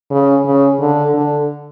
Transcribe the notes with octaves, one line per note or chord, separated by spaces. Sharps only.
C#3
C#3
D3
D3